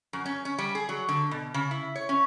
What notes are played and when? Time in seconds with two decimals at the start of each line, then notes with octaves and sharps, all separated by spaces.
0.13 F#2
0.26 C#4
0.45 C#4
0.58 G3
0.75 G#4
0.89 F#3
1.09 D3
1.31 B2
1.54 C#3
1.71 E4
1.95 C#5
2.09 C#4